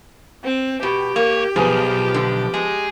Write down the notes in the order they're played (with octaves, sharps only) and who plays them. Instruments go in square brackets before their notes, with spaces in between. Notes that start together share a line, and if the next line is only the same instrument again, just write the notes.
[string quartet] C4
[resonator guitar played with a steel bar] B2 [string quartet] G4
[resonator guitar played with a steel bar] A#3 [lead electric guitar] C#5
[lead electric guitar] B1 [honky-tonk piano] F3 B3 [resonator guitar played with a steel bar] G#4
[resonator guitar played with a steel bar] D3
[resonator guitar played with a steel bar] G#3 [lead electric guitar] G#4